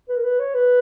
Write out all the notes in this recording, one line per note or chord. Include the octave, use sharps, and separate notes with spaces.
B4
A#4
B4
C#5
B4